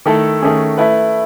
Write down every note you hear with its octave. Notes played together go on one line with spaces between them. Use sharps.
D#3 A3 E4 A4
D#3 A3 C#4 G#4
A3 E4 B4